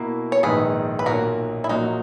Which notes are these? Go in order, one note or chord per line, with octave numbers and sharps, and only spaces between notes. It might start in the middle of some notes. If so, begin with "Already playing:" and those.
Already playing: B2 A#3 E4
C#5
A#1 G#2 D#3 G#3 D#4 G#4 B4
B4
B1 A#2 A#3 F#4 A#4
E4
A#1 A#2 F#3 A#3 D#4 F#4